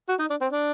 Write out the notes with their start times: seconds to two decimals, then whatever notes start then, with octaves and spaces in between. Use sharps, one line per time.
0.09 F#4
0.19 D#4
0.30 D4
0.41 C4
0.52 D4